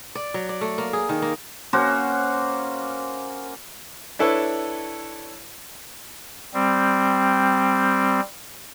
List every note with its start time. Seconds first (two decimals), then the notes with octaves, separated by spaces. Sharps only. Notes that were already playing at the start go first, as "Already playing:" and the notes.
0.15 D5
0.34 F#3
0.49 D5
0.61 A3
0.78 A#3
0.93 G#4
1.09 D#3
1.22 A#3
1.73 A#3 C#4 F#4 C5
4.19 D4 E4 A4 B4 C#5
6.54 G3 C4